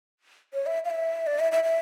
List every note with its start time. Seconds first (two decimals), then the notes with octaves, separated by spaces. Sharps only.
0.54 C#5
0.66 E5
0.85 F5
0.90 E5
1.27 D5
1.39 E5
1.52 E5
1.64 E5